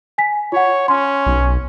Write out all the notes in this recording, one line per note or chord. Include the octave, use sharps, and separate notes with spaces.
G#5 B6
F4 C#5 F#5
C#4 C6
B1